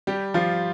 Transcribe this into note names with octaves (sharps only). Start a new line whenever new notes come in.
G3 G4
F3 F4